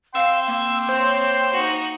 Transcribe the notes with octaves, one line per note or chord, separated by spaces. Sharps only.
F5 G5 C6 E6
A#3
C4 C5 C#5
D#4 F#4